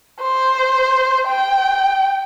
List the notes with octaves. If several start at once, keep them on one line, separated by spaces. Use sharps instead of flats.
C5
G5